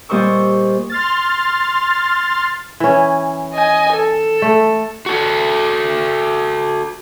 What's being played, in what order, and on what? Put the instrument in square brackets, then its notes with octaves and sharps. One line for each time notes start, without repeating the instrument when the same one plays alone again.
[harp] A#2 G3 C5 D#5 C#6 E6
[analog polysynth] C6 F6 A6
[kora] E3 C#4
[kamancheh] D#5 G#5
A4
[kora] A3
[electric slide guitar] F#4 A4